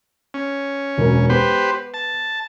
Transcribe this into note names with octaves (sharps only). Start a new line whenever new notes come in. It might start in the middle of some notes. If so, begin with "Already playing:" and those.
C#4
E1 F#2 A#4
B3 G4 B4 C5
A5